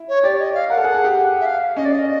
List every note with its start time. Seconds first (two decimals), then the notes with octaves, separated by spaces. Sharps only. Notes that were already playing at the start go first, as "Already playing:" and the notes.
Already playing: E4
0.08 C#5
0.23 G4 D5
0.39 D#5
0.54 F5
0.69 A#4 F#5
0.78 A4
0.84 G#4
0.95 G#4
1.04 G4
1.40 E5
1.46 F5
1.76 C#4 D#5
1.85 D5
1.92 D#5